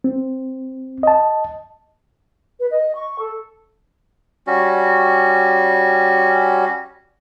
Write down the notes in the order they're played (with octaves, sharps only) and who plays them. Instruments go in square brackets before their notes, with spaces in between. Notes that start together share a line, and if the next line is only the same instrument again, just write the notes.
[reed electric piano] C4
D#5 A5
[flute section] B4
D#5
C#6
A4
[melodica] G3 C#4 F#4